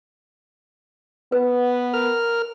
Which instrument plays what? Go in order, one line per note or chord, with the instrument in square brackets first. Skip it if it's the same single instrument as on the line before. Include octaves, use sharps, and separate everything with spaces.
[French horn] B3 [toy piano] B4
[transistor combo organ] A#4 F6